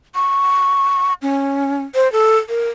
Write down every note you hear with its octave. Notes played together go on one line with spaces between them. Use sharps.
C#6
C#4
C5
A4
A#4